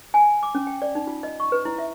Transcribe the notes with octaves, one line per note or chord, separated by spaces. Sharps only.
G#5
D6
C#4
G5
D5
D#4
F4
D#5
C#6
B4
E4
E5